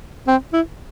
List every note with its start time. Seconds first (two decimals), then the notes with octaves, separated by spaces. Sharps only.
0.28 C4
0.53 E4